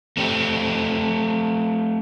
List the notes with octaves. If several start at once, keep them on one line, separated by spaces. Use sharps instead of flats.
A3 C4 G4